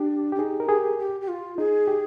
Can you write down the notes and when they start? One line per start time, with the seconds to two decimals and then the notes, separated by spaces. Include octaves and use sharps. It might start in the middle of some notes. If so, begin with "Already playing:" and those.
Already playing: D4 G4
0.32 G4
0.35 D4
0.39 D#4 G#4
0.60 A#4
0.69 G4 G#4
0.99 G4
1.21 G4
1.28 F4
1.58 D#4 G#4
1.88 G4